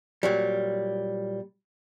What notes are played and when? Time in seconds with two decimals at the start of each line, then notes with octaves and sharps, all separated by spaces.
0.23 A#2 F#3 G3